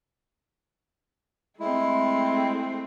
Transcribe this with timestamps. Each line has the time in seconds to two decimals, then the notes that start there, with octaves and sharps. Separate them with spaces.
1.59 G#3 A3 C4 E4